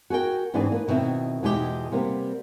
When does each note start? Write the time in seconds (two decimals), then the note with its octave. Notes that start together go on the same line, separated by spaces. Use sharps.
0.10 F#4 G#4 A#4 G5
0.54 G#2 E3 B3 C4 D4 G#4
0.72 A#3 B4
0.88 B2 D#3 C4 E4
1.43 E2 B2 G#3 D#4 E4 G4
1.92 C3 G3 A#3 B3